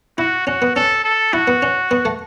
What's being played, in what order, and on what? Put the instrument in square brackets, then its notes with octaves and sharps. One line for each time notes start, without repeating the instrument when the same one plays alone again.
[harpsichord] E4 [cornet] F#4
[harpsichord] C#4 [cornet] F#4
[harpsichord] B3
[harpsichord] C#4 [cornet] A4
[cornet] A4
[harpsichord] E4 [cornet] F#4
[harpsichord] B3
C#4
B3
A3